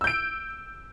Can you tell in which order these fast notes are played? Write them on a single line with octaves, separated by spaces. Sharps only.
E6 G6 D7